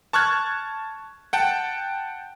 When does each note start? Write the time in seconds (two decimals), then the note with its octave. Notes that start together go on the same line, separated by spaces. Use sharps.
0.13 A5 C#6 F6 F#6 G#6
1.33 F#5 G5 A5